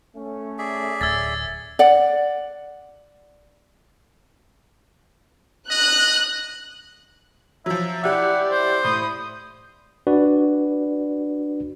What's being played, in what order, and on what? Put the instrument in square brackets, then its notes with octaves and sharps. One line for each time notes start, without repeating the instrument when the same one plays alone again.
[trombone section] A3 C#4
[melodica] G#4 D5 E5
[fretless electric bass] D1 [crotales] E6 G#6 A6
[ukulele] D5 F#5
[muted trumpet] D#5 [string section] F#6
[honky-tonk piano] F3 F#3 [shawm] E5
[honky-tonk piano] E4 G4 E5 [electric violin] D5 [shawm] F#5
[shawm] C5
[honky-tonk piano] A2 [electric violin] D#6
[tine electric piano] D4 F#4 B4 D5